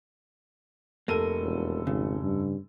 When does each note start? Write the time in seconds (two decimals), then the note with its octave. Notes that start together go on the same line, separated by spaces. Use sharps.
1.08 F1 A#3 A4 A#4 D#7
1.41 E1
1.87 G#1 C#3
2.22 G2